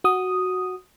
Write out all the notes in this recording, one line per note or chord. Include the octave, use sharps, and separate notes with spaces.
F#4 D#6